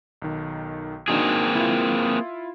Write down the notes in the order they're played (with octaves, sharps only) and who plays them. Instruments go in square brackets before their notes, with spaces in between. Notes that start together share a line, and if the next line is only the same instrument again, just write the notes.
[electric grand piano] B1 D#3
[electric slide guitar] A#3 C4 G#4 [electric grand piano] D4 D#4 F#4
[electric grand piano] E4 F4